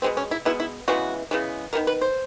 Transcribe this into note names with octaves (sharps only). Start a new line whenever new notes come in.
B2 G#3 B3 C4
C#4
E4
B2 G#3 B3 E4
E4
C#3 E3 G#3 B3 F#4
C#3 E3 G#3 B3
D#3 G#3 B3 A#4
B4
C5